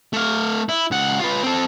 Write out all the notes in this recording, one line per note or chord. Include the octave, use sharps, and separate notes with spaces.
A3 F5
E4
C#2 F#5
F4 B4
C4 A4